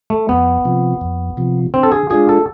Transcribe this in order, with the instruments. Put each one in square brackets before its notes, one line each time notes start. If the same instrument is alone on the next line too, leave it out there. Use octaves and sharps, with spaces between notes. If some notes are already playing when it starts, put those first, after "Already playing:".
[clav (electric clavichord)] A3
[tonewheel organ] F2 [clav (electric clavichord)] B3
[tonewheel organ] C3 F3
F2
C3 F3
[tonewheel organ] D3 [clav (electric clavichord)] C4
[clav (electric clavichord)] A4
G#4
[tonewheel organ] G#3 D4 F4 [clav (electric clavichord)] G#4
[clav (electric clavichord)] A4